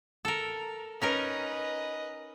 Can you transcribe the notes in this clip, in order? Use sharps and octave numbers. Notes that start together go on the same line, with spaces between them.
A4 A#4
C#4 D#4 A#4 B4 D#5